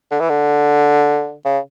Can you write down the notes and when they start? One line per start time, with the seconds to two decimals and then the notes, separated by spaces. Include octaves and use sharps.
0.11 D3
0.20 E3
0.30 D3
1.45 C#3